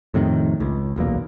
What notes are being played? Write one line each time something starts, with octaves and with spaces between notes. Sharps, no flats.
F2 A2 C3 D#3
C#2
D#1 B1 E2 A#3